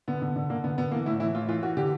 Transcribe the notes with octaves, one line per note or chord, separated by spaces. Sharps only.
D3 B3
D3
D3
D3 A#3
D3 B3
D3 B3
E3 A#3
A2 E4
E3 E4
A2 F4
E3 F4
E3 F#4
D3 G4